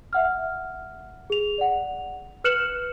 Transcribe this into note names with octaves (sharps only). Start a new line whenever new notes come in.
E5 F#5 F6
G#4 F7
D5 F#5
B4 F6 F#6 C#7 E7 F#7